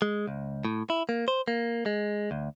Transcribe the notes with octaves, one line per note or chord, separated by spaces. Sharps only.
G#3
C#2
A2
E4
A#3
C5
A#3
G#3
D2